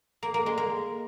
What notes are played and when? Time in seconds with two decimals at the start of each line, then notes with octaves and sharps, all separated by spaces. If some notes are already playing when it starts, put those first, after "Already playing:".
0.23 A#3
0.34 A#3
0.46 G#3
0.58 A#3